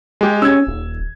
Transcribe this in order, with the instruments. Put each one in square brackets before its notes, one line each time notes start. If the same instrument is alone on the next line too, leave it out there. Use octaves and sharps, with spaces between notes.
[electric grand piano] G#3 G4
[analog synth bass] C#4 [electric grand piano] E6 G#6
[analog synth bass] D#1